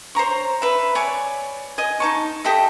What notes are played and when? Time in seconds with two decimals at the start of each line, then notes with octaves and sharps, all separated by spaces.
0.15 C5 C#5 A#5 C#6
0.62 B4 E5
0.95 C#5 D5 G#5
1.78 D#5 G#5
2.00 D#4 A5 C#6
2.44 G4 A4 D#5 E5